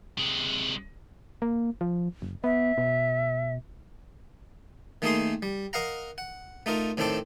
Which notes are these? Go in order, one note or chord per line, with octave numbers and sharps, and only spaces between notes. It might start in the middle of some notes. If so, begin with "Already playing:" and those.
C3 G#3
A#3
F3
F#1
B3 E5
B2
D#3 A3 A#3 D#4 G#4 C6
G3
A#4 D#5 F5 F#5 A#5
F#5
A3 D#4 F4 A#4
A2 D#3 C4 D4 A4 D6